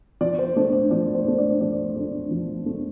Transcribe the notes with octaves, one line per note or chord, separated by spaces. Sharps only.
F3 D5
C5
A3 D4 D5
D5
F3 D5
C5
A3 D4
D5
F3 D5
A3 D4
F3
A3 D4